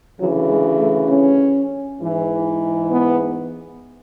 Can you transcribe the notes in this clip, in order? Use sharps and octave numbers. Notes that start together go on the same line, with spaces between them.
D2 C#3 E3 F#3
G#3
A3
C#4
G#2 E3
B3